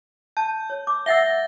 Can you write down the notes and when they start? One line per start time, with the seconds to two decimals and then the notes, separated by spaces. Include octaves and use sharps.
0.37 A5 G6
0.70 C#5
0.87 D6
1.06 E5 F#5 E6 A6 A#6 G7